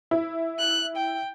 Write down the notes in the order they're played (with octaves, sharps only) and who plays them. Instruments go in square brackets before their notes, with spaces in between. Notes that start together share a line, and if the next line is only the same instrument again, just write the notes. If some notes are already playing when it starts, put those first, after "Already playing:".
[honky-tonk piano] E4
[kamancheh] F#6
G5